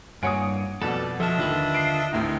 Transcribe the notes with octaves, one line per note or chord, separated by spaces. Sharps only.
G2 A#3 C#5 F#5 G#5 D#6 C#7 D7
F2 B2 G3 A4 D5 F#5 A6 E7
F3 D4 F#4 A4 D#5 E5 F6
D#2 D3 F4 B4
C7 D7
D2 A2 C3 D#3 D#4